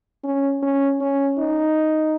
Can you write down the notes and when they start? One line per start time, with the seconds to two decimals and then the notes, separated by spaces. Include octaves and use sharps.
0.24 C#4
0.62 C#4
1.01 C#4
1.39 D#4